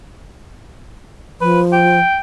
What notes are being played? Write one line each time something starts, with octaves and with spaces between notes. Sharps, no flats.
F3 B4
G5